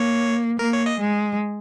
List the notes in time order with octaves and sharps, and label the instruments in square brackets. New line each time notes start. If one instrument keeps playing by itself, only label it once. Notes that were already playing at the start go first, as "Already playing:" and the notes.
Already playing: [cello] A#3 [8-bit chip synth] C#5
[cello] A#3 [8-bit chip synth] A#4
[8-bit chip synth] C#5
D#5
[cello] G#3